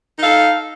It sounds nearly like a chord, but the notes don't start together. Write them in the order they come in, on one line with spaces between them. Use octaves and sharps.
D#4 F5 A4